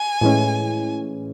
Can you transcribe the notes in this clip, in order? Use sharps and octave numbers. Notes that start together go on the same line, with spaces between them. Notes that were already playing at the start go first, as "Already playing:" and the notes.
Already playing: G#5
A2 E3 G#3 C#4